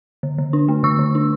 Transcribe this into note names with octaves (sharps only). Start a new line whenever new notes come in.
D3
D3
D4
A3
D3 C#6 E6
D3
D4